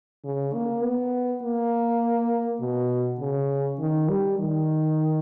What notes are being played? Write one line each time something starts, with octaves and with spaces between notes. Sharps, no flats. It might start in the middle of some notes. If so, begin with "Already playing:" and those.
C#3
A#3
B3
A#3
B2
C#3
D#3
G3
D#3